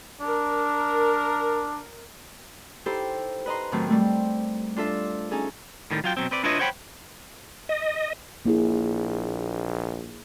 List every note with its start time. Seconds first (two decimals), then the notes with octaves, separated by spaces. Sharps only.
0.21 D4 A#4
2.86 D#4 E4 G4 A4 C5
3.46 B4 D#5 A#5 C6
3.72 A2 D#3 F#3 A3 C4
3.88 G3 A3 C4
4.76 D4 F4 A4 E5
5.31 C#4 D#4 G#4 A4
5.91 A2 D#3 G3
6.04 F#3 F4 G5
6.17 B2 F#3 C4
6.31 C4 B4 D5
6.44 D4 E4 F4 B4 C#5 D#5
6.59 C5 C#5 F#5 G5 A#5 B5
7.69 D#5
8.45 A#1 A#3 E4 G#4